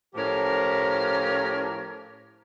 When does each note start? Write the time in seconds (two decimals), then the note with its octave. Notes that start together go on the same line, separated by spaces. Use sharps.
0.15 A2 F3 C#4 G4 A#4